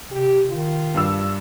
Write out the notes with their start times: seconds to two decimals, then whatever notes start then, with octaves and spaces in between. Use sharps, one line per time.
0.12 C3 G4
0.48 D#3 F4
0.94 G2 D4 E6